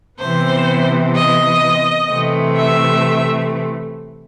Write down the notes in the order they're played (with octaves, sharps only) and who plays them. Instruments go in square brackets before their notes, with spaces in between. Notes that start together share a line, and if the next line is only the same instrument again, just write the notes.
[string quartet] C3 E3 B3 C5
D#5
C3 E3 A3
E5